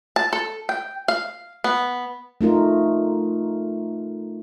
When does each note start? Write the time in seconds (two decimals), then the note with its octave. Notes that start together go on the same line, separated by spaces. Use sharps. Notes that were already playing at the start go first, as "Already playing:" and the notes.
0.16 A5
0.33 A4
0.69 G5
1.08 F5
1.64 B3
2.41 A3 D#4 F4 A#4